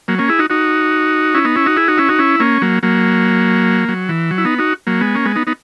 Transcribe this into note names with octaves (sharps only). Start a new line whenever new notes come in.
F#3 A#3
A#3 C#4
E4 G#4
D#4 F#4
D#4 F#4
C#4 E4
B3 D#4
C#4 E4
D#4 F#4
E4 G#4
D#4 F#4
C#4 E4
D#4 F#4
C#4 E4
A#3 C#4
F#3 A#3
F#3 A#3
F#3
E3
F#3
E4
B3 D#4
D#4 F#4
F#3 A#3
G#3 B3
A#3 C#4
G#3 B3
B3 D#4
B3 D#4